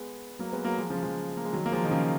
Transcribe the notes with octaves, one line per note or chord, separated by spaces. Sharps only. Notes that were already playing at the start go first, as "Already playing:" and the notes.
Already playing: G#3 B3
F#3 A#3
G#3 B3
F#3 A#3
F3 G#3
C#3 F3
F3 G#3
A#3
G#3
D#3 F#3
A#3
F3 G#3
D#3
C#3 F3